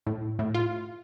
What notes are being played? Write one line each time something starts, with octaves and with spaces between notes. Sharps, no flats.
A2
A2
F4